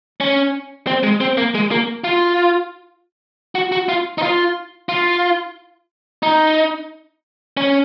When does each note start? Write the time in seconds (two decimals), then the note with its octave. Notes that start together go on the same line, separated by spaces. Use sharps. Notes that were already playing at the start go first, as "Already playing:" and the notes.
0.20 C#4
0.87 C4
1.03 G#3
1.21 C4
1.37 A#3
1.55 G#3
1.71 A#3
2.04 F4
3.55 F#4
3.72 F#4
3.89 F4
4.18 D#4
4.22 F4
4.89 F4
6.23 D#4
7.57 C#4